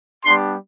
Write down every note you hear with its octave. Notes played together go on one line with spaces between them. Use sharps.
G3 B3 D4 G4 C6